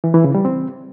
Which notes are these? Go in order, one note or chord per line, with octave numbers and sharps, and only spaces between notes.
E3
E3
C#3
G3
C4